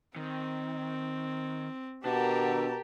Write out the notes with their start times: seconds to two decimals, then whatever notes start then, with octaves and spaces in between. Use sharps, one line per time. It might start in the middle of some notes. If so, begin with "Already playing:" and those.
0.16 D#3 C4
2.05 B2 D4 G4 A#4 F#5 A5